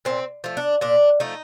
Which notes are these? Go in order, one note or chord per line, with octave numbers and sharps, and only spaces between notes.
A#2 C4
F3 A3
D4
A#2 D4
F3 A3 D#4